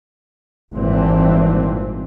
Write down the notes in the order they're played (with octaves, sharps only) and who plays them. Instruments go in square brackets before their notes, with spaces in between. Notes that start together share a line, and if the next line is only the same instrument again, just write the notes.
[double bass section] G#1 G2 A#2 E3 C4